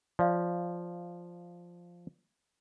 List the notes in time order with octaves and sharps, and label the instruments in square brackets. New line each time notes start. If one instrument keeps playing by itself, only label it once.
[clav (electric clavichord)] F3 [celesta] D5 F5